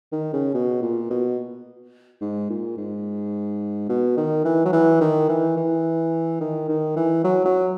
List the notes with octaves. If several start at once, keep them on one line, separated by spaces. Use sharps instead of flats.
D#3
C#3
B2
A#2
B2
G#2
A#2
G#2
B2
D#3
E3
F#3
E3
D#3
E3
E3
D#3
D#3
E3
F#3
F#3